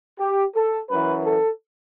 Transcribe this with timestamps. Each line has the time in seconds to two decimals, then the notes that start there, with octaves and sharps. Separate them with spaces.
0.19 G4
0.54 A4
0.89 F#2 E3 B4
1.24 A4